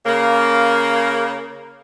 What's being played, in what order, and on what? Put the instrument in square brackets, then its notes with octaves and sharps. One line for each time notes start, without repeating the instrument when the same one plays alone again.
[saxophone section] C#3 A#3